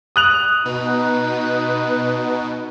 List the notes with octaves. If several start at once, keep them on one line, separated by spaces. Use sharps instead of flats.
D#6 F#6 F7
B2 D#4 B4